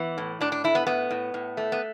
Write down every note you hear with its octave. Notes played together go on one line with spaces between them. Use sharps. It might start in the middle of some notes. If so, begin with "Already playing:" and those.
Already playing: E3 B3
A2
A2 D4
D4
A3 E4
B3
A2 B3
A2
A2
A3
B3